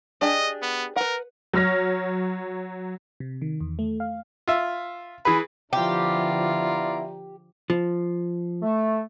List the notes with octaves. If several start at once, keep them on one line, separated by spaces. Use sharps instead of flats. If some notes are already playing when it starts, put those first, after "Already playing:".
D4 G4 G#4 D#5
B3
A#4 B4 F#5
F#3 C#5 F6 A#6
C3
D#3
E2
A3
F5
F4 E5
E3 G#4 B4 B5
D3 F3 B3 E4 F4 G4 D5 A#5
F3
A3